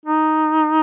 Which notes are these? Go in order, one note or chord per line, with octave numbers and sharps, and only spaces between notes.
D#4